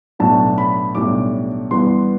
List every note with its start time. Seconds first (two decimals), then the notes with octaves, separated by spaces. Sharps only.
0.19 B1 A2 F#3 B3 D4 A5
0.58 B5
0.95 B1 A2 G3 D4 D6
1.71 G2 E3 B3 C6